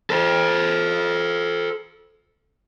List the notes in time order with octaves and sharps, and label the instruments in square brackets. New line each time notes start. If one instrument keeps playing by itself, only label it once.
[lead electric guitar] A4 C5